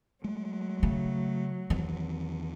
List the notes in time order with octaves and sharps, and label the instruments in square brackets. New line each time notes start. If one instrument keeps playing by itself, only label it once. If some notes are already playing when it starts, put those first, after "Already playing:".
[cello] F#3 [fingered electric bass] G#3 A3
[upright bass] C#3 [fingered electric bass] A3
[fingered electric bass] E2 D#3 E3 [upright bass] C4